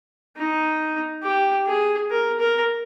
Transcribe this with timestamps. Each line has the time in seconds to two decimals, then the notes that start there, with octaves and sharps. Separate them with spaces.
0.37 D#4
1.23 G4
1.67 G#4
2.11 A#4
2.40 A#4